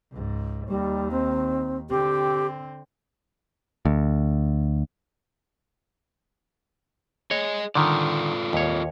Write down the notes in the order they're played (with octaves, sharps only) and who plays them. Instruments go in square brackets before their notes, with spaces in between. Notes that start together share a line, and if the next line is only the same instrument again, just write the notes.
[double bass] C#2 G#2
[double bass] D#2 D#3 [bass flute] G3
[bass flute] C4
[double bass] D3 C4 [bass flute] G4
[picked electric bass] D2
[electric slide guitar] G#4 D#5 [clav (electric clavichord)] C#5
[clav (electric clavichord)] D3 D#3 [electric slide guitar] F4 A4 D5
[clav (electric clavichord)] D#2 C#5